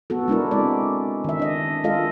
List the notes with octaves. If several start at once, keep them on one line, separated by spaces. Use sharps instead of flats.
B3 F#4 A4
G#3 D4 E4 A#4
G#3 C4 D5
D#3 E5
D4 D#5
G#3 F4 A4 D#5 F5